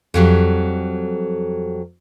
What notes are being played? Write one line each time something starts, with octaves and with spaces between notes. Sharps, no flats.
F2 F#3 G3